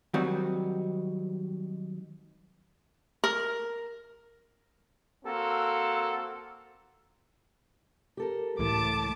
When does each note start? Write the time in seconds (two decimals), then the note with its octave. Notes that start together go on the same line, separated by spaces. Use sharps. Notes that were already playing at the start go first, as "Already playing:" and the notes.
0.14 D#3 F#3 G3 C4 D#4
3.24 A#4
5.24 A#3 C4 F#4 A4
8.17 G4 A4 A#4
8.59 C#2 A2 E3 A3 A5 D6